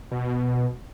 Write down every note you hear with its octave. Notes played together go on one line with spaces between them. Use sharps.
B2